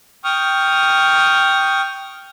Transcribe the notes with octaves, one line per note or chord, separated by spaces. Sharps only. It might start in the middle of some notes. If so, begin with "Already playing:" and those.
G5 C#6 D#6 F6